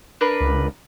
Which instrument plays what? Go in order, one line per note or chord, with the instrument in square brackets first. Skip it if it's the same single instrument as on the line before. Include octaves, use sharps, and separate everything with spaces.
[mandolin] D4 A#4 B4
[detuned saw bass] C#2